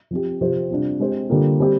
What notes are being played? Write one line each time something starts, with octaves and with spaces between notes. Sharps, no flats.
F3 C4 G4
C3 F3 C4 G4 C5
C3 G3 D4 F4
G#3 C4 G4 C5
D3 G3 A#3 F4
G3 C4 G4